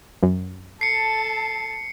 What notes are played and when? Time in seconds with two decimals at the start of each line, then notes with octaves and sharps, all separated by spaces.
0.23 F#2
0.81 A4 A5 C7 C#7